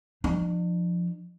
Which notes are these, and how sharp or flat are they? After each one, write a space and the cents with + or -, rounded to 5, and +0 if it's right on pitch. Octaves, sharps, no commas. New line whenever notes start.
F3 +0 D4 +45